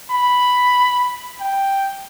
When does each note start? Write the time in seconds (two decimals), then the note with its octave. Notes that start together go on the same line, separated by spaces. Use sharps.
0.11 B5
1.40 G5